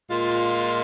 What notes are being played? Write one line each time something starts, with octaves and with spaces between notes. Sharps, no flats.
A#2 G#3 F4